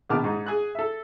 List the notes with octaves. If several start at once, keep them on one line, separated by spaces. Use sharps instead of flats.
A#1 B2 D#3 A5 D6 F6
G#2 D#4
G#4 F#6
A4 E5